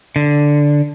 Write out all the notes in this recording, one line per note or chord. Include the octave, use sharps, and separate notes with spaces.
D3